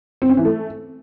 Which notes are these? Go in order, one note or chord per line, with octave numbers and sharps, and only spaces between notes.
C4
C#4
E3
A3